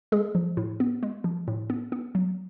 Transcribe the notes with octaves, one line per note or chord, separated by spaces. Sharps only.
G#3 G#4
F3
A2
B3
G#3
F3
A2
B3
B3
F#3